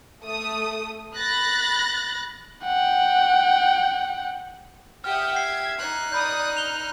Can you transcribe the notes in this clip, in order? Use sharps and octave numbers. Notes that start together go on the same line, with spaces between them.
A3 D#6
B5 F#6 A6 A#6
F#5 G5
G4 E5 F#5 G5 D#6 F6
G#6 C7
D#4 F#6
D5 B5 D#6 G6
F6 F7 G7